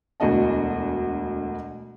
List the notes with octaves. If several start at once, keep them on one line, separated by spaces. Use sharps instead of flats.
E1 D2 B2 F#4 D#5 A5